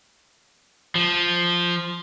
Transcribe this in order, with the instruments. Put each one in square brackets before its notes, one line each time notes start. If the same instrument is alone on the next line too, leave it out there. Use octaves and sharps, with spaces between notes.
[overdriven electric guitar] F3